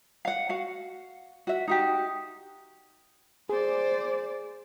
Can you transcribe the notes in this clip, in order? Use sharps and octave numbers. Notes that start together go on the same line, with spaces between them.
F5 F#5
F#4 F5 F#5
F#4 E5
D#4 F#4 G4
G#4 C5 D5